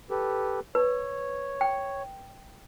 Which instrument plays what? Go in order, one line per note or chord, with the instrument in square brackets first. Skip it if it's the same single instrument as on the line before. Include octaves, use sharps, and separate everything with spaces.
[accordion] G4 A4 B4
[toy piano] B4 [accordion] C#5
[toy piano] G5